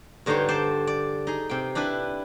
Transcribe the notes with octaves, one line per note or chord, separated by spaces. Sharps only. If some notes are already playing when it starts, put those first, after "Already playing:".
G2 D3 D#4 C5 C#5 G5
C5 D5 G5 A5 C6
D5
D#4 G#4
C3 G5
D4 E4 G4 B4